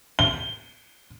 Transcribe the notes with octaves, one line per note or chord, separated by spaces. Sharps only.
G7